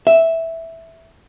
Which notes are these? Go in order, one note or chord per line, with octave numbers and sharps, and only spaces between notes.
E5